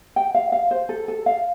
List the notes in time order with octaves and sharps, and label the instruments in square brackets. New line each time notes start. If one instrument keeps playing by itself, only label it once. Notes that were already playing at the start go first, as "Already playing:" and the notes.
[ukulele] G5
F5
F5
C5
A4
A4
F5